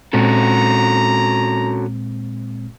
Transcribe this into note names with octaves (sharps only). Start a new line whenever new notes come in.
A#2 G#3 C4 C#4 F#4 A4 A#5